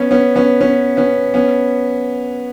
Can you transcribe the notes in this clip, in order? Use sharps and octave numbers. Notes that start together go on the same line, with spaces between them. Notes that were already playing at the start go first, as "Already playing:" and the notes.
Already playing: B3 C#4
B3 C#4
B3 C#4
B3 C#4
B3 C#4
B3 C#4